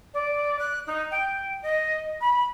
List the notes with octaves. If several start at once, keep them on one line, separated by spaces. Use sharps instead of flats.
D5
F#6
D#4
G5
D#5
B5